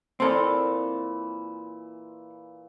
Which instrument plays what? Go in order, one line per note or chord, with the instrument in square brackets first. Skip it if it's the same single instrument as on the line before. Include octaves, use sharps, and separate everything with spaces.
[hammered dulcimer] A#2 E3 C6 [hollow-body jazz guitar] C4 A4